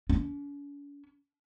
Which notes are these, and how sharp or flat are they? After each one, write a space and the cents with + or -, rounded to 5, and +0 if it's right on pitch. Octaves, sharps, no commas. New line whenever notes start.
C#4 +45